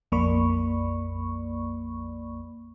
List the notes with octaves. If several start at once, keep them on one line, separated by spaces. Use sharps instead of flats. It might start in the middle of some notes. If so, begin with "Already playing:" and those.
A#1 F2 A#3 D5 B5 C#6